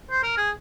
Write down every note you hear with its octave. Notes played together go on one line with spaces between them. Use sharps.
C5
A#4
G#4